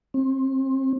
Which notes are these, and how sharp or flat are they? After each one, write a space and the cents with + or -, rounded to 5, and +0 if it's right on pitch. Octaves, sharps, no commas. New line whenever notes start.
C4 +30